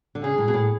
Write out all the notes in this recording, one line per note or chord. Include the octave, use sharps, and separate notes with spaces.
D3
C#3 G#4
A2
B2
A2